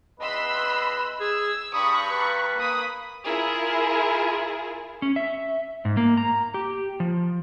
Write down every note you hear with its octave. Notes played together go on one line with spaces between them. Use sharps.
E2 B4 D#5 B5 C6 E6
G#4 E6
G2 A#5 B5 C#6 D#6
B4
A#3 B5 D#6
E4 F4 G#4 A#4
C#4
E5
G#2
A#3
A#5
G4
F3